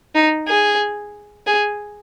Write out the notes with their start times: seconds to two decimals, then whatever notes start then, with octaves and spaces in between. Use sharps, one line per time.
0.15 D#4
0.48 G#4
1.47 G#4